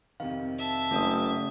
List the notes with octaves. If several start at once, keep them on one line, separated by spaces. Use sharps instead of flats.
F2 C3 D#3 F5
E5 A5
F#1 C#3 A3 C#4 D#6